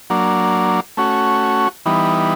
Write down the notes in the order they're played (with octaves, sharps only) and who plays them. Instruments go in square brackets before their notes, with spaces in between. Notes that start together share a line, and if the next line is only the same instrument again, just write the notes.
[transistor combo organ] F#3 A#3 D4
A3 C#4 F#4
E3 G3 B3 D#4